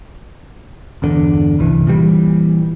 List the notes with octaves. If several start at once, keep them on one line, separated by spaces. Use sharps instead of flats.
G1 E2 D3
F#1 C2 E3
A#2 E3 G3